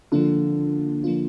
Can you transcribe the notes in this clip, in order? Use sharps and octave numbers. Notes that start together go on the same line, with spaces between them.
D3 F3 A#3 D4 F4
F3 A#3 D4 F4